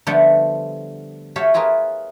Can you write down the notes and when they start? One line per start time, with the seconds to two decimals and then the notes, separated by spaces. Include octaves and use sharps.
0.07 D3 F3 G3 A3 B3 D4
1.36 F#4 G4 A4 C#5 E5 F5
1.54 E4 F4 G#4 A#4 B4